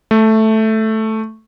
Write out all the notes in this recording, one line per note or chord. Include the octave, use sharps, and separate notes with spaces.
A3